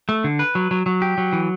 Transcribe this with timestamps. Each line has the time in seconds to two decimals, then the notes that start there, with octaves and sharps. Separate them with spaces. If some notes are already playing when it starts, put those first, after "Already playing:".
0.09 A3
0.24 D3
0.39 B4
0.55 F#3
0.71 F#3
0.86 F#3
1.02 G4
1.18 F#3
1.33 E3